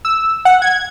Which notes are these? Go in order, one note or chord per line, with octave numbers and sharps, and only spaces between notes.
E6
F#5
G#6